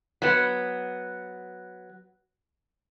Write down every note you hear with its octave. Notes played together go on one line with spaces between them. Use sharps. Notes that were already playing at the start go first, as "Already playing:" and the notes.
F#3 B3